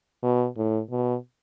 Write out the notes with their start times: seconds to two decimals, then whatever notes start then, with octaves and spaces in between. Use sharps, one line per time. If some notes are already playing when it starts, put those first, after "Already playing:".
0.23 B2
0.57 A2
0.91 B2